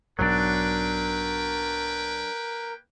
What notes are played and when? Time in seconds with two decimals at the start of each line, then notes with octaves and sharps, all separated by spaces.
0.19 B1 G#2 F#3 A#3 D4 A#4 B4 G5